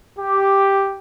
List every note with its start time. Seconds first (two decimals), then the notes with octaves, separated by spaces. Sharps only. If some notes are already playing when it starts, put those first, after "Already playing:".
0.19 G4